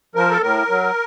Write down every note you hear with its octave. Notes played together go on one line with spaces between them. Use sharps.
F3 A#4
A4
A2 A#4
F#3